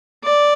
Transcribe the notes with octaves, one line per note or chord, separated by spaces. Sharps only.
D5